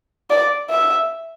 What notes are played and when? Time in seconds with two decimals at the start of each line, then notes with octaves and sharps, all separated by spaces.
0.30 D5
0.70 E5